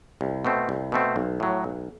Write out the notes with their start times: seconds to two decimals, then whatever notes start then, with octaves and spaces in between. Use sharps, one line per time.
0.21 C2
0.45 B2 A3 C4
0.69 C2
0.92 B2 A3 C4
1.16 B1
1.40 A2 F#3
1.64 B1